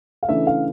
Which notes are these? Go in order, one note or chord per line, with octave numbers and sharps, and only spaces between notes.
F5
C#3 E3 A3 D4 E5
F5